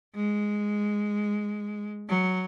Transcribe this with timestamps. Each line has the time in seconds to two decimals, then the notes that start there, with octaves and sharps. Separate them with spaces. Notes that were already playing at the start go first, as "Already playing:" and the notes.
0.15 G#3
2.08 F#3